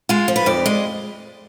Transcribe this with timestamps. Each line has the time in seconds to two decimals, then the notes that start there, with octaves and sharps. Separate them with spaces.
0.09 G#3 F4
0.28 F3
0.36 B4
0.46 F2 D5
0.66 G#3